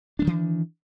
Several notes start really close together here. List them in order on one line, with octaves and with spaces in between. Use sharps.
D4 G#3 D#3 E3